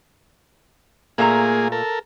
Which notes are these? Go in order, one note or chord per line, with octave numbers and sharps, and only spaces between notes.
A#2 A3 A#3 G#4 A#5
A4 A#4